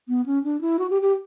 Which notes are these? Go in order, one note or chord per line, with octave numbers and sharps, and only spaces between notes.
B3
C#4
D4
E4
F#4
G4
G4